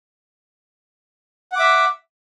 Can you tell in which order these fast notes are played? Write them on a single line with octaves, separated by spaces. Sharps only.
F#5 D6 E5